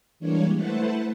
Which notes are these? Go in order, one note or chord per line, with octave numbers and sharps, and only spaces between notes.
E3 G3 G#3 A#3 D4 C#5
A3 E4 B4 C5 F#5 A5